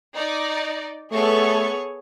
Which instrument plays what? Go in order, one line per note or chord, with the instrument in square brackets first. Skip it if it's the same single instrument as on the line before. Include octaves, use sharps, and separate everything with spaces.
[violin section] D#4 D5
[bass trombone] A3 [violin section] B3 A4 C#6 [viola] G#4 C#5